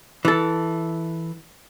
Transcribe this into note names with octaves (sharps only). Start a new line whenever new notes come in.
E3 A4